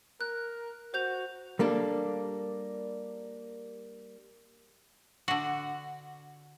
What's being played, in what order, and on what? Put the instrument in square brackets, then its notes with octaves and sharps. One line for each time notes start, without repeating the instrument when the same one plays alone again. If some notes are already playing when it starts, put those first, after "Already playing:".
[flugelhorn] A#4 [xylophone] F#6
[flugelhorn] F#4 [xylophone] C5 G6 F7
[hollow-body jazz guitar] G3 A#3 D4 A4
[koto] D3 F#4